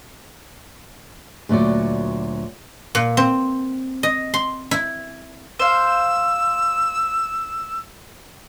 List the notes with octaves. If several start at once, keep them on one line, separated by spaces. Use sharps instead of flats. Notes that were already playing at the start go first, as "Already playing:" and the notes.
D2 A#2 F#3 F#4 D5
A#2
C4
D#5
C6
E4
C5 F5 E6